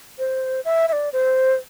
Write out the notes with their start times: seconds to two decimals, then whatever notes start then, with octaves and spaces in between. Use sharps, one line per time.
0.19 C5
0.65 E5
0.88 E5
0.93 D5
1.13 C5